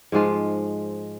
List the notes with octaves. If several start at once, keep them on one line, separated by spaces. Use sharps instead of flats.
G#2 F3 G#3 F4